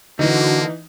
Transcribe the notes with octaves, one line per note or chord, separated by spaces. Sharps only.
D3 E3 A#3 D#4 F#4